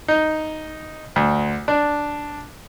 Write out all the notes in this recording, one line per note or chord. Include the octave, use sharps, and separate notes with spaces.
D#4
D2
D4